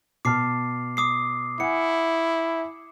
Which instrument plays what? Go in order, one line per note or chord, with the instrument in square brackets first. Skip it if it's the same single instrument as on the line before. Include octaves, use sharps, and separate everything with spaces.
[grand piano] B2 A5 F6 [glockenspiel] D6 C7
[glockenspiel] D6 D#6 C7
[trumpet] E4 [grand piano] F#5 G#5 [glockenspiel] C#7